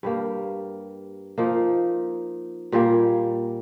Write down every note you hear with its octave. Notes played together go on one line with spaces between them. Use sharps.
G2 G3 A#3
F3 A#3 D#4
A#2 G3 A#3